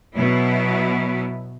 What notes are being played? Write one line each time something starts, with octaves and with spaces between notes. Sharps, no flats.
B2 F#3 B3 E4